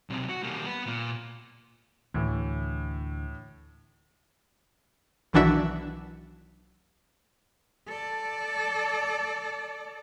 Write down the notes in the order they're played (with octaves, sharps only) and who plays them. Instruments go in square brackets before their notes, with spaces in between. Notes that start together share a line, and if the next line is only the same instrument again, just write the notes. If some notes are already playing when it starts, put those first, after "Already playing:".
[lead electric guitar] B1 C3
F#4
G3 A#3
B3 B4
A#2
[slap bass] D2 [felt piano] A2 E3
[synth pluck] B1 D#3 E3 D4 F#4 E5
[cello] A4 D5